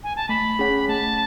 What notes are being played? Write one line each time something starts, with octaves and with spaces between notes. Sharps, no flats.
G#5
A5
A3 B5
C#4 G#4 C#5 F#5
A3 A5